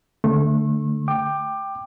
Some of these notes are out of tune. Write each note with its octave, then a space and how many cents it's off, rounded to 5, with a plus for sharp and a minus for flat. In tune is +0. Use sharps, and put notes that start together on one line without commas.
D3 +0 A3 +0 C#6 -35
G5 +0 D6 +20